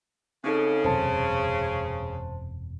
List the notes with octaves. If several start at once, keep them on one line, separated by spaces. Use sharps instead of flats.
C#3 C4 D#4 A4
E1 F#2 C3 C5 A5